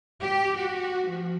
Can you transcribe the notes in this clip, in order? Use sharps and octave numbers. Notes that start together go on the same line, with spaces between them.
G4
F#4
F3